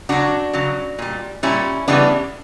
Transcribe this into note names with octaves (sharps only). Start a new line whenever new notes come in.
C#3 F#3 D4 F#4
C#3 F#3
A#2 G3
A#2 G3 C#4 E4
C#3 E3 G3 B3 D4